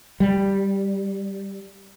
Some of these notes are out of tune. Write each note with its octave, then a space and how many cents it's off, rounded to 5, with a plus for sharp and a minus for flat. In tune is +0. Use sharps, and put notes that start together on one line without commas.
G3 +0